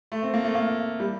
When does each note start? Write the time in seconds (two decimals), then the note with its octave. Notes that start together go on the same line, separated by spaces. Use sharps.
0.12 A3
0.23 C4
0.34 A#3
0.45 A3
0.55 A#3
1.00 G3